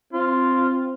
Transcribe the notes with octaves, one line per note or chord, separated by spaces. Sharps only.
C4 F4